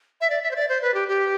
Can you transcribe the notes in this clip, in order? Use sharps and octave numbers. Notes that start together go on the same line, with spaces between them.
E5
D5
E5
C5
D5
C5
B4
G4
G4